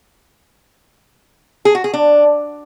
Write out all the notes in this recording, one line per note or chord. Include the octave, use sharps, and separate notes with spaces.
G#4
F#4
G#4
D4